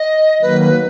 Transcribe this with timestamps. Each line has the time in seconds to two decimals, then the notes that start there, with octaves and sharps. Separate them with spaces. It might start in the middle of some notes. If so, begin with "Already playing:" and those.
Already playing: D#5
0.42 D#3 F#3 A#3 B4
0.61 B4